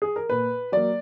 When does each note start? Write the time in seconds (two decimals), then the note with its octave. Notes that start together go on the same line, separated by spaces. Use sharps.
0.02 G#4
0.16 A#4
0.30 A#2 B4
0.72 F#3 A#3 D5